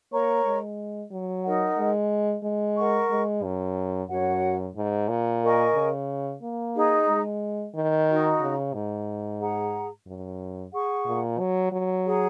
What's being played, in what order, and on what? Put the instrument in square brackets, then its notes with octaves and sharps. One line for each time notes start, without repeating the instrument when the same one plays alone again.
[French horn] A#3 [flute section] A#4 C#5 A#5 C#6
[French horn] G#3
F#3
[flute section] D#4 A#4 D#5 F#5
[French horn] G#3
G#3
[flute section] A#4 F#5 C#6
[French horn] G#3
F#2
[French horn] F#2 [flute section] F#4 C#5 F#5
[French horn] G#2
A#2
[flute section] A#4 D#5 G#5 C#6
[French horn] C#3
A#3
[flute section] D#4 G#4 D#5 A#5
[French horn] G#3
D#3
[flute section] D#4 F#4 D#5 A#5
[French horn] C#3
G#2
[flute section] G#4 F#5 A#5
[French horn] F#2
[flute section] G#4 F#5 C#6
[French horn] A#2
F#3
F#3
[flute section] G#4 F#5 A#5